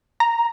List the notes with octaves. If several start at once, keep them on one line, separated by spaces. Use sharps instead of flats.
A#5